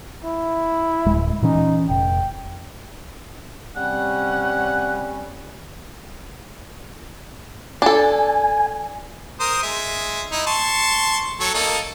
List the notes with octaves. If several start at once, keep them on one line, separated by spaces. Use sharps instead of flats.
E4
D1 G#3
A#2 E3 C#4 D#4
F1 G5
C3 G3 C#4 F#5
D4 A4 G#5
A#4 C5 D#6
G#3 E5
D#4 E4
A5 C6 C#6
F#3 A4 C#5
A#3 D#4 A4